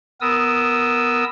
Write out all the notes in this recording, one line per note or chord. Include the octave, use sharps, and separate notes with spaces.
B3 A#4 D#6 E6